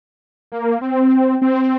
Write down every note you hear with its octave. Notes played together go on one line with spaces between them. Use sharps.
A#3
C4
C4